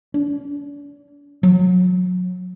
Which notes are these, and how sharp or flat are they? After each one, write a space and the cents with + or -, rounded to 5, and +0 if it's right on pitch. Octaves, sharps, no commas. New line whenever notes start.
D4 -35
F#3 -30